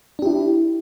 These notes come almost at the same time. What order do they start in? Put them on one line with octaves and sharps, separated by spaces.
D4 G4 E4